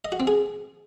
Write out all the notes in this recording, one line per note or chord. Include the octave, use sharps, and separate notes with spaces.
D#5
F#4
C4
G#4